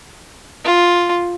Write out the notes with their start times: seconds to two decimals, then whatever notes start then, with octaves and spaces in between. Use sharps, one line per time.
0.65 F4